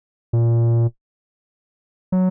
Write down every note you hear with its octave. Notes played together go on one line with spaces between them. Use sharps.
A#2
F#3